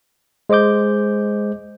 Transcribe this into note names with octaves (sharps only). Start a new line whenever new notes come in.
G#3 C5 D#5 D6 G6